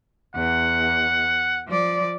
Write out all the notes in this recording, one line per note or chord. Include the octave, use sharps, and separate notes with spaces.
E2 F#5
F3 D5